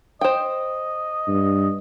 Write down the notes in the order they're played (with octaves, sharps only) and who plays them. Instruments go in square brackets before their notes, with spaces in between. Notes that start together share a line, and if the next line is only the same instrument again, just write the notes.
[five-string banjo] C5 G5 [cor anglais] D#5
[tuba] G2